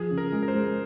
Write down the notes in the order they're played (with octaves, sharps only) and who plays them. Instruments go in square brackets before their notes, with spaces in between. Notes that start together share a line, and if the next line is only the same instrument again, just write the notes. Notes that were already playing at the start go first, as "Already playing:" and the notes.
Already playing: [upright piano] F3 [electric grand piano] G#4
[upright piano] C#3
[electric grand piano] A#4
[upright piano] G#3
[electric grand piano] A#4
C5
[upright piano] G#3